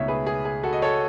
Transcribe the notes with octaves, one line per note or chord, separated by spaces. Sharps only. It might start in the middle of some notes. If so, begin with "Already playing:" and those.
Already playing: C#2 B2 A3 D#4 C#5 E5
G#4 B4
G#4
G#4
F#4 A4
D#5
A4 C#5